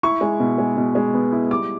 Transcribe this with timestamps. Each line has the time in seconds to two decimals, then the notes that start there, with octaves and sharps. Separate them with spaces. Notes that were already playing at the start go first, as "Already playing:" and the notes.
0.03 E4 C#6
0.21 G#3
0.40 B2
0.58 G#3
0.77 B2
0.95 G#3
1.14 B3
1.32 E4
1.50 G3 D6